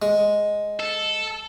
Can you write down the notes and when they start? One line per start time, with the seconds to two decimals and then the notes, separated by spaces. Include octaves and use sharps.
0.02 G#3
0.80 A4